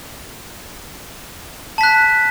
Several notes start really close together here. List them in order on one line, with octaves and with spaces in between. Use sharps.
A5 B6 F#6